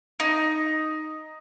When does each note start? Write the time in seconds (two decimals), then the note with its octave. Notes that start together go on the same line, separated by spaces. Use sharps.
0.20 D#4